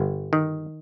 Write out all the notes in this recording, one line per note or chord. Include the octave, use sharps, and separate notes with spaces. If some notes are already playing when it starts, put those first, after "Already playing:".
Already playing: G1
D#3